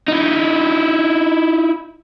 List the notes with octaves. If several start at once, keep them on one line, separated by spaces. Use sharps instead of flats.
D#4 E4